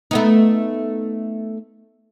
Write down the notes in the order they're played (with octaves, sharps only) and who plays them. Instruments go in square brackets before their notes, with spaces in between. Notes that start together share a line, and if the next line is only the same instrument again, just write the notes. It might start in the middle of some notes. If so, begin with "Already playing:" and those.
[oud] A3 B3 D#4